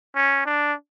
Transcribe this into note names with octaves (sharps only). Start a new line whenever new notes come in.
C#4
D4